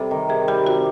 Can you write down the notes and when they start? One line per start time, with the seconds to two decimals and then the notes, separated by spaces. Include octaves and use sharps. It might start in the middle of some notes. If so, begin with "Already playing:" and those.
Already playing: C3 G3 A4
0.11 D#3
0.29 C3 G#4
0.48 G3 G4
0.66 C3 F#4